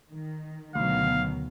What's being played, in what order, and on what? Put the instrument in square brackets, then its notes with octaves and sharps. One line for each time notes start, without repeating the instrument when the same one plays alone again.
[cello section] D#3
[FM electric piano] D2 [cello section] B2 D#3 F#3 [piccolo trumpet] F5